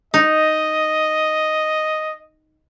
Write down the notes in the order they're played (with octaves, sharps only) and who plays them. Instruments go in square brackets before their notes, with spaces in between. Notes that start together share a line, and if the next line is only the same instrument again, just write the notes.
[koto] D#4 [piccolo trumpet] D#5